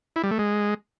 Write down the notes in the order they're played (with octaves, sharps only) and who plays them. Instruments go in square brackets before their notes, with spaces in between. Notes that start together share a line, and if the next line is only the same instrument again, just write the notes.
[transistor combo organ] E4
G3
A3
G#3